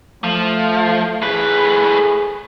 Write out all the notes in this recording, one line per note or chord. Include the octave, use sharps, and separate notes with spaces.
F3 A3
A2 G#4 B4